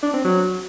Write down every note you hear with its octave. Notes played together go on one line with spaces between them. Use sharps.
D4
C4
F#3